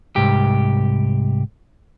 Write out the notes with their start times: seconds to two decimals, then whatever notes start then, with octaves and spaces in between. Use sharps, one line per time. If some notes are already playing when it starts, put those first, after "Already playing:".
0.16 C2 G#2 G4